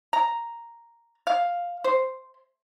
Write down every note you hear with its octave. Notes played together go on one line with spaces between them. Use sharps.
A#5
F5
C5